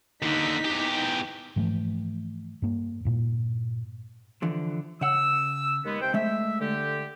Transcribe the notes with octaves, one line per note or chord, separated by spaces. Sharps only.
D#2 D3 D#4 B6
E2 G4
G#2 E3 F3 A3
G2 A#3
G2 A#2
D3 E3 F3
C#3 F#5 E6
D#2 G#3 B3
C3 C5 G5
G#3 A3 E5
D3 G4